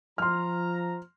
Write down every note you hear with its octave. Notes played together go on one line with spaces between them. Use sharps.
F3 A#5 C6 F6